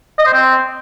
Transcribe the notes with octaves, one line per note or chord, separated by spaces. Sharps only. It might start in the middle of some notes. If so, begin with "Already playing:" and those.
D#5
C5
C4